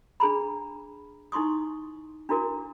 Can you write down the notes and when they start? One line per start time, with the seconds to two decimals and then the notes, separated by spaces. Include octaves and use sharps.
0.20 D4 G#4 A#5 B5
1.32 D#4 E4 C6 C#6 D#6
2.29 D4 E4 F#4 A#4 D6